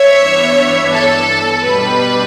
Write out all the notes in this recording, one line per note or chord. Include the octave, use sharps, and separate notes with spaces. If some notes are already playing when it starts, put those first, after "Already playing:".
Already playing: C#5 E5
G2 E3 B3 D4
A4
B2 G3 D4 B4